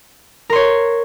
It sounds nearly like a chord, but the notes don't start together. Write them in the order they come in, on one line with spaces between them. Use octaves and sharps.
A#4 C6 C#5